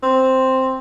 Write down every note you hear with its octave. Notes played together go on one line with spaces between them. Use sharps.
C4